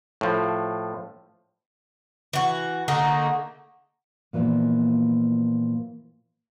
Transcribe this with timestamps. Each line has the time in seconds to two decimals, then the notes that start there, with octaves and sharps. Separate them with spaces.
0.21 A2 F3
2.33 E3 F#4
2.88 D3 A3 A#3 D#4
4.33 A#2 E3 F3 G3 A#3 B3